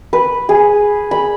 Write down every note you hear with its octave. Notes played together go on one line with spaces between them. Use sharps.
B4
G#4
B5